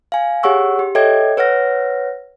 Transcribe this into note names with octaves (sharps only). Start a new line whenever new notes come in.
F5 G#5
G4 G#4 C#5 F#5 C#6 E6
G4
A4 C#5 D#5 E5 G5 G#6
B4 C#5 F#5 F6 A#6